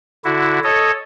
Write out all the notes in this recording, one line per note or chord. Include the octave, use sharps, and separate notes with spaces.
D3 E4 F#4
A4 C#5 D#5